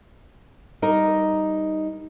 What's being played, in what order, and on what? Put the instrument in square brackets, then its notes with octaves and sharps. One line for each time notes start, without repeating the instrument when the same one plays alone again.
[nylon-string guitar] G3 D#4 A#4 D#5